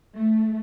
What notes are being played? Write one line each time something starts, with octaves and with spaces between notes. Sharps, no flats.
A3